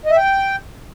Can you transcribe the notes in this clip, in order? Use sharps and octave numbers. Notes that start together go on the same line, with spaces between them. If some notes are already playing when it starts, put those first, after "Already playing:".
D#5
E5
G5